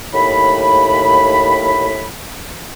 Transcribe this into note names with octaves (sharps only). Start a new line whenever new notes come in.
D#2 A2 B5